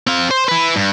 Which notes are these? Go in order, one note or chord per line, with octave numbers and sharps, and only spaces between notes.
C4 F5
C5
E4 B4
G2